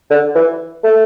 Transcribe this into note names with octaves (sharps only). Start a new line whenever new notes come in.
D3
E3
A3